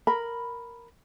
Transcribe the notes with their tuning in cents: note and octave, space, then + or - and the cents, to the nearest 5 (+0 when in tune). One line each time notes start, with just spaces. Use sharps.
A#4 +0 B5 +0